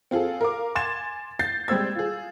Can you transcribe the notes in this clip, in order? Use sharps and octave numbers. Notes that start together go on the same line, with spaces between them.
C4 F4 G#4 A4
A#4 F5 D6
G#5 C6 G#6 A6 E7
G6 A6 C7
G3 G#3 C4 C5 E6 G#6
F4 G#4